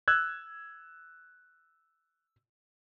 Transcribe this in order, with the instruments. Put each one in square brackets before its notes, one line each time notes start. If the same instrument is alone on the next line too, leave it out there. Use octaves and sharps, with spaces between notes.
[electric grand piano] E6 F#6 G#6